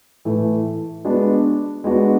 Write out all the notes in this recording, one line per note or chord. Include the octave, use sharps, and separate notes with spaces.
A2 E3 A3
G#3 B3 D4 F#4
G#3 B3 D4 F#4